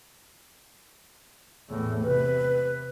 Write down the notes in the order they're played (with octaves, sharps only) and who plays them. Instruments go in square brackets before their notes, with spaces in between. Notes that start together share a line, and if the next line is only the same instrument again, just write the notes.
[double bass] E2 A2
[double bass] C3 [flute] B4